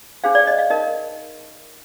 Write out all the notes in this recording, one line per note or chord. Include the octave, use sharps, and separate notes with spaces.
D4 G#4 C5 F5
D5
D#5
F5
D#4 A#4 D#5